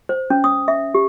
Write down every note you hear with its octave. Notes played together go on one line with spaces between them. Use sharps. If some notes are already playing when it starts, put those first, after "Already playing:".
C5
C#4
D#6
E5
G4